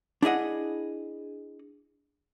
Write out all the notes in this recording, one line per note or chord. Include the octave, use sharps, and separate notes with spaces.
D4 E4 G#4 D#5 F#5